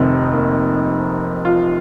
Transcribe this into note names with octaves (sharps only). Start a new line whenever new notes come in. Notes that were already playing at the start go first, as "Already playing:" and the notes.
Already playing: F1 F2 C3 D#3 C4
A#3
F4